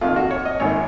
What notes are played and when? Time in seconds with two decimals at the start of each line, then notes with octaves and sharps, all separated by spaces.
0.01 F2 D#3 F4
0.16 F#4
0.31 C#5
0.45 D#5
0.60 G#1 F#2 D#3 C#5